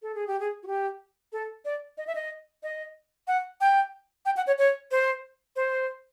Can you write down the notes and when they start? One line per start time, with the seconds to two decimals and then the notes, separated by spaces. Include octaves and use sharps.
0.02 A4
0.15 G#4
0.27 G4
0.40 G#4
0.63 F#4
0.67 G4
1.32 A4
1.65 D5
1.98 D#5
2.07 E5
2.15 D#5
2.63 D#5
3.28 F#5
3.61 G5
4.25 G5
4.37 F#5
4.47 C#5
4.58 C#5
4.91 C5
5.56 C5